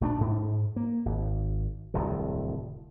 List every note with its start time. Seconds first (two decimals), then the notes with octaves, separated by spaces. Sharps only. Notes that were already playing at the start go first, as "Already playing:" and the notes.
0.01 A#1 A3 C#4 D4
0.21 G#2
0.76 A#3
1.05 G#1
1.94 D1 C2 F2 D#3